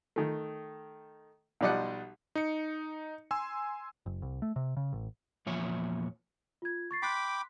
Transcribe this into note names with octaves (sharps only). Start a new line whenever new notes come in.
D#3 A3
B1 F3 G3 D5 D#5 F#5
D#4 C#7
G#5 C6 E6
F#1
C2
A3
C3
C#3
A1
E2 A#2 F3 C#5 E5 G#5
F4 G#6
C#6 A6 C7
G5 B5 C6 D6 F#6 B6